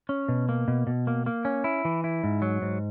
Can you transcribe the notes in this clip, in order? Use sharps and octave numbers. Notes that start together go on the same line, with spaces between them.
C#4
B2
A#3
B2
B2
A#3
A#3
C#4
E4
E3
E4
G#2
F#3
G#2